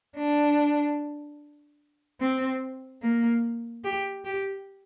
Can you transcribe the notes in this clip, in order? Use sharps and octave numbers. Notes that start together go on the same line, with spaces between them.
D4
C4
A#3
G4
G4